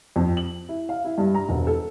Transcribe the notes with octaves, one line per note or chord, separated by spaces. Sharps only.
F2
F#7
E4
F5
E4
G2
A#5
E1
A4